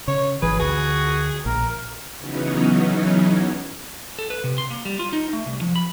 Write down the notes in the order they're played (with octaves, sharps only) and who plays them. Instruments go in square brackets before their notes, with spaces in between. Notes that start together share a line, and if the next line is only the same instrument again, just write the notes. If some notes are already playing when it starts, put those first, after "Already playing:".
[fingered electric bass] C#3 [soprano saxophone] C#5
[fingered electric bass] G#1 E3 [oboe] G#4 [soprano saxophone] B4
[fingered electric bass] D2 [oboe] F#4 [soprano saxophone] G#4
[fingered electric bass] A#1 [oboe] A#4
[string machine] C#3 E3 F#3 B3 C#4 D#4
[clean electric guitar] A4
B4
C3
C6
A#3
G3
F4
D#4
A3
C2
F3
B5